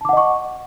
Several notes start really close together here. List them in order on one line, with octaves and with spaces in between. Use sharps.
A5 D6 F#5 D#5 C#6